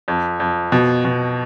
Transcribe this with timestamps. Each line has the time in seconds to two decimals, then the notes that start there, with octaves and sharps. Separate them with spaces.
0.08 F2
0.40 F2
0.72 B2
1.05 B2